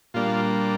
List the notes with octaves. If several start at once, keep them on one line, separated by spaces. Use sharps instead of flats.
A#2 G3 A#3 D4 F4